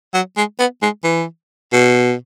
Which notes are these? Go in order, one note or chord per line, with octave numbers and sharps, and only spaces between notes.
F#3
G#3
B3
G#3
E3
B2